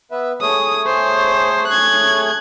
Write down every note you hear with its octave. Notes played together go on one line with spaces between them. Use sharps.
B3 B4 E5
A3 G#4 C#5 D#6
C5
F#6 G#6